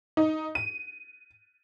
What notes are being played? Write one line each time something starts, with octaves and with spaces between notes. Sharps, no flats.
D#4
D#7